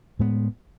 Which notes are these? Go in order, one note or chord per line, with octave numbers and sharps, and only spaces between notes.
A2 G#3 B3